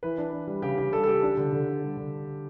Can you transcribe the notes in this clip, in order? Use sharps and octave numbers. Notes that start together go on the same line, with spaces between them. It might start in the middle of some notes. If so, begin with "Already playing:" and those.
E3 B4
D4
D4
G3
C#3 G4
C#3 G4
G3 A4
A4
G3 G4
D4
D3
D3
D4
G3
D3